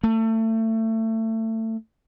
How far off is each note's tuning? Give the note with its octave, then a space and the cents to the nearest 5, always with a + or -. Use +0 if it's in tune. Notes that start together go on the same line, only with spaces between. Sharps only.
A3 +25